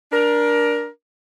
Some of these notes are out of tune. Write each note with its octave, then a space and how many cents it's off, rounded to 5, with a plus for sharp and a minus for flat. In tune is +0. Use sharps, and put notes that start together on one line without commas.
D4 +0 A#4 +20